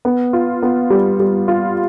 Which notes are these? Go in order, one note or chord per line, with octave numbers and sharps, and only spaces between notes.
B3
F4
B3
G3
G3
F4